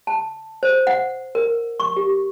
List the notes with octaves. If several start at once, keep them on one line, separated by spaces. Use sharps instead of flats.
A5
C5
F#5
A#4
C#6
G4